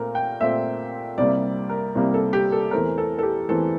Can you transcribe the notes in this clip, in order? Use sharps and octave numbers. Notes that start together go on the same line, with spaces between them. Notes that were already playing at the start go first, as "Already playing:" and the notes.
Already playing: A#2 A3 C4 A#4
G5
A#2 A3 C4 E5
C2 C3 G3 A#3 D5
A#4
C2 C3 G3 A#3
A4
G4
A4
E2 E3 A3 C4 A#4
A4
A4
G4
E2 E3 A3 C4 A4